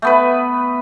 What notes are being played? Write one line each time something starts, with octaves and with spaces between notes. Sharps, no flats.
A3 B3 B4